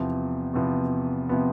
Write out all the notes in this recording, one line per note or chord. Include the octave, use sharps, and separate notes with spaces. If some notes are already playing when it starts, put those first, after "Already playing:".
Already playing: E2 C3 F3 B3
E2 C3 F3 B3
C3 F3 B3